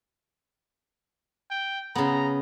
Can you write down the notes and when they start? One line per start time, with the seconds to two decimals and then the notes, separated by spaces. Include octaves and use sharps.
1.51 G5
1.95 C#3 B3 A#5